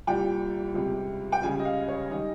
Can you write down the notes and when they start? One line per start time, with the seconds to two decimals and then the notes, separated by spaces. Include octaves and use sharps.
0.07 C2 A#2 G3 G5
0.74 C#2 C3 G3
1.32 G5
1.42 C#2 C#3 G3 G#5
1.59 D#5
1.65 F5
1.88 C#5
2.11 D#3 G3 D#5